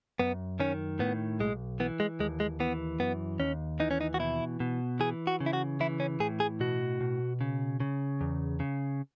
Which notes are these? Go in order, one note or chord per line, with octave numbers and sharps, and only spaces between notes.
F#2 B3
D#3 C#4
A2 B3
B1 G#3
E3 B3
G#3
D#2 G#3
G#3
E3 B3
F#2 B3
D#2 C#4
E3 D#4
C#4
D#4
F#4
B2 E4
B2
E3 G#4
F#4
C#3
E4
F#4
E3 E4
C#4
A2 G#4
G#4
B2 F#4
B2
C#3
C#3
E2
C#3